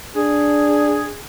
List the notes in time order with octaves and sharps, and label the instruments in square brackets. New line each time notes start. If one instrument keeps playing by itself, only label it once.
[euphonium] D4 [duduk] G#4